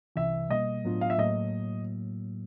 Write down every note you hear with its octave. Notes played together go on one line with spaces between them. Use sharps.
C2 C3 E3 E5
B2 G3 A#3 D#5
A2 F#3 B3 D4 F4
F5
E5
A2 F#3 A#3 D#5